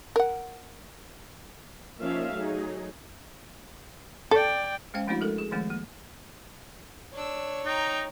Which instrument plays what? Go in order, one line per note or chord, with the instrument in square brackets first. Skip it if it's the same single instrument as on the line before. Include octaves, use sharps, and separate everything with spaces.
[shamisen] A#4 F#5
[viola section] F3 A#3 C#4 D#4 E5 F5
F#3 A3 D#4 G#4
[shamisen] A4 [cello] D5 G5
[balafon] G#3 C#4 C5 F5 G5
F3 A3 C4 D4 E4 F#4
G#3 A4 A#4
G#4
D#3 F3 G#3 A3 C4
A#3
[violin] D4 E6 [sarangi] C#5
[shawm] D#4 [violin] G5 A#5